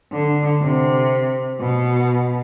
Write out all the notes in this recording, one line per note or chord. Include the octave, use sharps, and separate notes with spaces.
D3
C3
B2